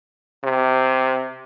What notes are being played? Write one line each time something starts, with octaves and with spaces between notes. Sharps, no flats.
C3